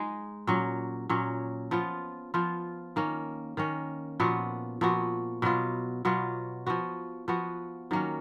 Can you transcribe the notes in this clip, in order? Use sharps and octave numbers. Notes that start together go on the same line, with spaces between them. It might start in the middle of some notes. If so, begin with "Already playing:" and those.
Already playing: G#3 D#4 G#4
A#2 F#3 C#4
A#2 F#3 C#4
F3 B3 F4
F3 B3 F4
D#3 A#3 C#4
D#3 A#3 C#4
A#2 F3 B3 F#4
A#2 F3 B3 F#4
B2 F#3 B3 F4
B2 F#3 B3 F4
F3 B3 F#4
F3 B3 F#4
D#3 F#3 A#3 C#4